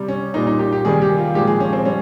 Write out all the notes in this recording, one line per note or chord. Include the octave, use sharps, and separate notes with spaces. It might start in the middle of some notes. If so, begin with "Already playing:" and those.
Already playing: C3 G3
C#4
A#2 G3 D#4
D#4
G4
G4
C3 D#3 G3 G#4
G4
F4
A#2 F3 G#3 G4
G#4
C#4
C4
G3 C#4